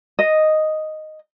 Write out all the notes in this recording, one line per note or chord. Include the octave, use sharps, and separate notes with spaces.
D#5